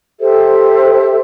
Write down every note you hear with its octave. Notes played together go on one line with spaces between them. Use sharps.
G4 A4 C5 E5